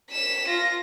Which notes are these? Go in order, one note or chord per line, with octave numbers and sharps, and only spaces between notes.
B6 E7
F4 A#6